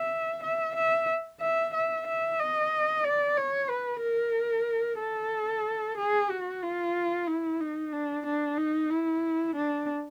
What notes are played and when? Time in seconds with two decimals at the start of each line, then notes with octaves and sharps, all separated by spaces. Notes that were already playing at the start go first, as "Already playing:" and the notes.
Already playing: E5
0.43 E5
0.75 E5
1.41 E5
1.74 E5
2.07 E5
2.39 D#5
3.04 D5
3.37 C#5
3.69 B4
4.01 A#4
4.99 A4
5.98 G#4
6.30 F#4
6.63 F4
7.28 E4
7.60 D#4
7.92 D4
8.26 D4
8.58 D#4
8.90 E4
9.56 D4